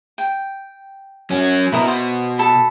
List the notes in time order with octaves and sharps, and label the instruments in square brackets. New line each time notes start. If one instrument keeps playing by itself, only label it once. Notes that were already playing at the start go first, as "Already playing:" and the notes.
[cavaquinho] G5
[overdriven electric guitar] F#3 C#4
[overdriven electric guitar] B2 [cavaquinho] E4 A#4 D#5
[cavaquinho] C5
A4 B5